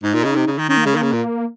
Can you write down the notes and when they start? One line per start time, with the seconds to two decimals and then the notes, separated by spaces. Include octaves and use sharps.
0.03 G#2 D#4
0.14 A#2
0.24 C#3
0.36 C3
0.47 C#3
0.58 D#3
0.69 D#3 C#4
0.77 A#3
0.86 C#3 G#3
0.93 D#3 A#3
1.02 C#3
1.12 A#2